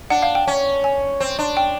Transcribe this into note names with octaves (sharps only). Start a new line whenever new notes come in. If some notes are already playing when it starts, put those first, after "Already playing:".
D4 F#5
F5
G5
C#4
G#5
C4
D4
G5